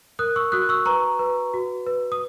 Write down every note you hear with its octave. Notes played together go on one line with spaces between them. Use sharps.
A#4 D#6 F#6
C#6 E6
F#4 D#6 F#6
C#6 E6
B4 A#5 C#6
B4
F#4
B4
D#6